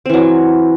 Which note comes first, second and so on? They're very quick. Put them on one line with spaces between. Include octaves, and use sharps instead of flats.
C4 E3 F#3